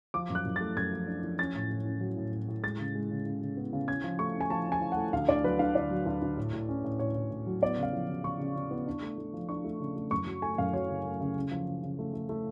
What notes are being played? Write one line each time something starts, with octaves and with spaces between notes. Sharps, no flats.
F3 D6
F#2
F#6
F#2
A3 A6
F#2 G#6
F3
D4
F3
C#4 A6
A2
A2
C#4
F#3
A2
A2
A2
G#3 A6
C#3
G#3
C#3
C#3
C#3
B3
C#3
C#4 G#6
F3
A3 C#6
C#4
G#5
F3 A5
C#4
G#5
F3
A3 F#5
D2 F5
D2 D5
F#3 B4
D3 F5
D3 D5
F#3
D2
D2
A2
A2
C#4
A2
A2 C#5
A2
A2
F#3
B3 D5
C#3
F5
F3
C#3
C#3 C#6
C#3
C#3
B3
D4
A3
A3
F3
D4 C#6
A3
C#3
A3
F#2 C#6
F#3
A3 G#5
F#2 F5
F#3 C#5
C#3
A3
C#3
C#3
F3
C#3
C#3
A3
A3
A3